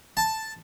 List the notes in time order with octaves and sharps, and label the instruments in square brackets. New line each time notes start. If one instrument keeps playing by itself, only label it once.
[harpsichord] A5